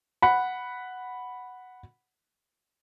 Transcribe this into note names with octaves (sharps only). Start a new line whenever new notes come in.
F#5 B5